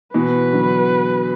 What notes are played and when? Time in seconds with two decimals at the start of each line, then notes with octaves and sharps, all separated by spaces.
0.14 B2 E3 B4
0.53 D3 F#3